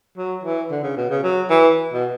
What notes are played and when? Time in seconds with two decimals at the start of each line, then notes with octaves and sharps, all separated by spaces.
0.18 F#3
0.44 E3
0.71 D3
0.83 C#3
0.97 B2
1.10 C#3
1.23 F#3
1.50 E3
1.93 B2